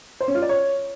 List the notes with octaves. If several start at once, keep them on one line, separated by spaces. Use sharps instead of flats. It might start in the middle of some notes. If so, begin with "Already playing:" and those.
C5
C#4
F4
D5
C#5